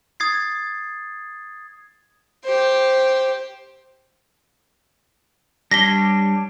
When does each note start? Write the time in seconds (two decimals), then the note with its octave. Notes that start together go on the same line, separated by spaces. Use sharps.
0.20 D#6 G#6 A6 C7
2.44 G4 C5
5.71 G3 D4 C#5 A#6 B6 G7